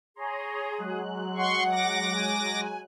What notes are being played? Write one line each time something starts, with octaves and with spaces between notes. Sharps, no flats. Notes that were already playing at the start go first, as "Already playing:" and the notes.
G#4 C#5 A#5 C6
F#3 G#3 F#6
F#5 C6 C#6
D6 A#6
G#5